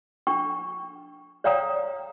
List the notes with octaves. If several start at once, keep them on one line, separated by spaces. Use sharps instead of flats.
D4 G5 C#6
C#5 D5 F5 G5 A#5 D#6